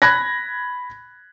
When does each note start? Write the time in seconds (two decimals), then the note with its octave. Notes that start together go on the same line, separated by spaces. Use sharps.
0.02 B5 F#6 G#6 A#6